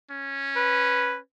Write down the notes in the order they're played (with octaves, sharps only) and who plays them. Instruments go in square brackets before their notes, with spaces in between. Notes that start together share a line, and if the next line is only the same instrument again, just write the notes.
[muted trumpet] C#4
[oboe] B4